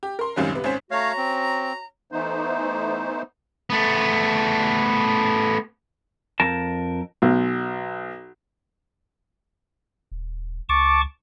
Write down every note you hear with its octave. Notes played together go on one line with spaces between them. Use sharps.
G4
A#4 C6
G#1 C#2 F#2 D#3 G3 C#4
C3 B3
G#1 C#4 C5 B6
A3 C#4 F#4 C#5 F5 A#5
C4
E3 A3 B3 D#4 C5
A3 B3
F2 A#4 A5
B1
D#1
C#2 A5 C#6 D6